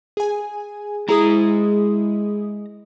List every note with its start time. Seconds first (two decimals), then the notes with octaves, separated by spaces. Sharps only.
0.17 G#4 G#5
1.08 G#3 E4 G#4 A#5 D#6